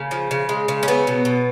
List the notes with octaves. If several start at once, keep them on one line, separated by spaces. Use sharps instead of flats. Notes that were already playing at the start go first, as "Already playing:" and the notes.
Already playing: C#3 A#3
F3
C#3
G#3
C#3
C#4
F#3 B3
B2
B2